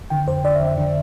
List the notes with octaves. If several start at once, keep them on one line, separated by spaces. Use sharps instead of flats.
D3 G5
F2 C5
D3 D5
E5
F2
E5
D3